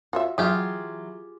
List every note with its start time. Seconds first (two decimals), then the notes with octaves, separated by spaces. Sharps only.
0.13 F4 F#4 C#5 E5
0.38 E3 F#3 F4 G4 G#4 D#5